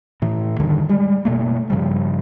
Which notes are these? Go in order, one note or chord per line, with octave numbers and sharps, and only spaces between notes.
A2 E3
E2 G2 D3 D#3
G3 G#3
F#1 B2 A3 A#3
G2 C#3 F3 G3